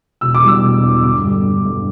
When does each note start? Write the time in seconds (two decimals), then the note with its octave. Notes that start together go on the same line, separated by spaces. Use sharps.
0.21 E1 E6
0.35 D6
0.42 E2 B2 G3
0.48 E6
0.62 E1
0.82 E2 B2 G3
1.03 G1 D6
1.23 G2 D3 G3
1.44 G1
1.65 G2 D3 G3